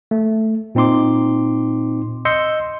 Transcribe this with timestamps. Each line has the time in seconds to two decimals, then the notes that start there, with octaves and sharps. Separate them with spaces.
0.11 A3
0.75 A#2 C4 D#4 C6 D6
2.25 D#5 C6 E6 G6 C#7